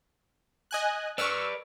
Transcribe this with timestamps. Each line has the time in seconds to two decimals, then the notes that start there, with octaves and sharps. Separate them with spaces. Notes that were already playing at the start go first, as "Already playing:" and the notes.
0.71 D#5 G#5 F#6
1.18 B4 D5 C#6 E6 F6